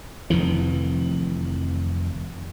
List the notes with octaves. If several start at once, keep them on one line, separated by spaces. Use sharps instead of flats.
F1 F2 D#3 E3